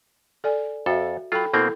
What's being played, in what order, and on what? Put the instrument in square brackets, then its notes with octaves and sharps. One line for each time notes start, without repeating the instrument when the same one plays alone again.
[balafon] A4 D5 G#5
[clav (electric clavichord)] F2 A4 [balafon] F#4 E5
[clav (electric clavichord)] F#3 F4 [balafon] A4 G5 B5
[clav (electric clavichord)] B2 A#3 C4 [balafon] E4 A4